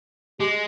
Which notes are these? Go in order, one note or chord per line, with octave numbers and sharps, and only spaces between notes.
G#3 G4